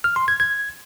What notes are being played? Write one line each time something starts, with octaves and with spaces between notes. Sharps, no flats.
F6
C6
G#6
G#6